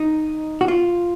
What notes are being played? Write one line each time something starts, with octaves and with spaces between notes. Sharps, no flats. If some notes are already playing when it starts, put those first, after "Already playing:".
Already playing: D#4
F#4
F4